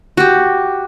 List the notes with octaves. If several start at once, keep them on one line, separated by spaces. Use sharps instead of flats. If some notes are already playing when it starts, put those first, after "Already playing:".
F#4 G4